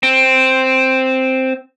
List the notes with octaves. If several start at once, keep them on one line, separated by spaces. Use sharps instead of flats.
C4